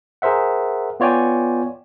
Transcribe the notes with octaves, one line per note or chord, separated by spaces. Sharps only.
G#4 A#4 C5 E5 F#5
B3 F4 C#5 D5 G5 G#5